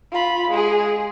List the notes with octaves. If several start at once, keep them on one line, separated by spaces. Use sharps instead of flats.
F4 B5
G#3 G#4